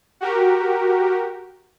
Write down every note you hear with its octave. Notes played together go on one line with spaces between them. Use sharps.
F#4 G4 A#4